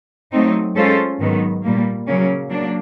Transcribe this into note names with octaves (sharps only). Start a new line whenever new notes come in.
F#3 A3 C4 D#4
G#3 C#4 F4 A4 C5
G#2 D#3 F#3 B3
A#2 G3 A#3
C#3 F#3 A#3 C#4
F#3 A#3 D4